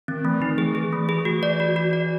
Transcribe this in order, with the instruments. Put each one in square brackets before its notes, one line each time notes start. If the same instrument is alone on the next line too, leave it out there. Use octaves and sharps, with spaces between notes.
[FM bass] D#3 [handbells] C4
[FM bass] E3 [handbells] A3
[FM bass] D#3 [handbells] D#4
[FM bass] E3 [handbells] G#4
[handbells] G#4
A3
G#4
[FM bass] E3 [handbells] F#4
[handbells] D5
F#4
F#4
D5